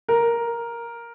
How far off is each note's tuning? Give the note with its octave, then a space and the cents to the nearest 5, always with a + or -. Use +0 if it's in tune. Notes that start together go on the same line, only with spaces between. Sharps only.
A#4 +5